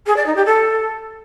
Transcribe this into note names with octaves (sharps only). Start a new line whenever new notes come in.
G#4
D5
D#4
G4
A4